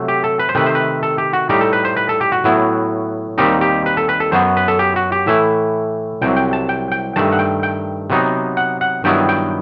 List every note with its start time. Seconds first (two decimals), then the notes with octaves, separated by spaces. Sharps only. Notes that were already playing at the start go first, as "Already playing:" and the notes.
Already playing: C3 F#3 A3
0.08 G4
0.24 A4
0.39 B4
0.49 C5
0.55 C3 D#3 A3 B4
0.66 C5
0.75 B4
1.03 A4
1.18 G4
1.33 F#4
1.49 A2 G3 D#4 G4
1.61 A4
1.73 B4
1.85 C5
1.97 B4
2.09 A4
2.21 G4
2.32 F#4
2.44 A2 F#3 B3 E4
3.38 D#2 D#3 G3 C4 D#4 G4
3.61 G4
3.86 B4
3.97 A4
4.09 B4
4.20 A4
4.32 F#2 F#3 B3 C5
4.57 B4
4.68 A4
4.79 G4
4.96 F#4
5.12 G4
5.26 A2 E3 A3 E4 E5
6.22 C2 C3 F#3 G5
6.37 G5
6.53 A5
6.69 G5
6.92 G5
7.16 G2 D#3 A3 A5
7.32 F#5
7.39 G5
7.63 G5
8.10 C3 F#3 B3 D#4
8.57 F#5
8.81 F#5
9.04 G2 D#3 F#3 B3 E4 G5
9.29 G5